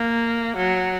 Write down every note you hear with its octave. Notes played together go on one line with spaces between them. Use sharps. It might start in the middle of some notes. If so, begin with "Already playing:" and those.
Already playing: A#3
F#3